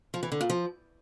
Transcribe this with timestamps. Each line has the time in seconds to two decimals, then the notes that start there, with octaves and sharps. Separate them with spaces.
0.14 F3
0.23 E3
0.32 D3
0.41 A#2
0.50 F3